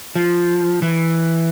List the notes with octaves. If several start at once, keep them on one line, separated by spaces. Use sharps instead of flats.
F3
E3